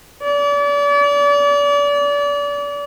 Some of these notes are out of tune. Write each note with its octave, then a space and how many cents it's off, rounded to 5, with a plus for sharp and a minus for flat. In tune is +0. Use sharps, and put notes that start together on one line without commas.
D5 -35